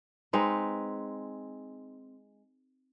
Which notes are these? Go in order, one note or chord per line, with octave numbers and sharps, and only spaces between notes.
G#3 C4 D#4 B4